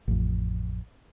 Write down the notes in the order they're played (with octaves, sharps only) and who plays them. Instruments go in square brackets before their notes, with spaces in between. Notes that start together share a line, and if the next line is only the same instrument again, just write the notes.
[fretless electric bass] A1 F2